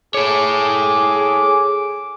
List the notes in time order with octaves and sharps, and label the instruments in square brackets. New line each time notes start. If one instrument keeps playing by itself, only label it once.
[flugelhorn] G#4 [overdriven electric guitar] A4 C#5 [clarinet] D6